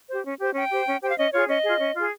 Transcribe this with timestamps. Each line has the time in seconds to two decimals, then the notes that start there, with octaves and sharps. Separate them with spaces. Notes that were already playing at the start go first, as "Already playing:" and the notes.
0.09 G4 C5
0.24 C#4
0.40 G4 C5
0.55 C#4 G5
0.71 G4 C5
0.87 C#4
1.01 G4 C5 G5
1.09 F5
1.18 C#4 D#5
1.33 F4 G#4 C#5
1.48 C#4 D#5
1.64 F4 G#4
1.80 C#4
1.95 F4 G#4